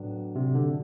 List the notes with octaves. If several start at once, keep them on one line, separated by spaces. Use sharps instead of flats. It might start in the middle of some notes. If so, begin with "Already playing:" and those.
Already playing: A2 F#3 B3 D4 F#4
C3
D3